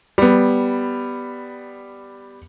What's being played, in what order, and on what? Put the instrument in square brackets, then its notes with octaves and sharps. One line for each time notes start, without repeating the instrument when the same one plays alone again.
[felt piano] G3 B3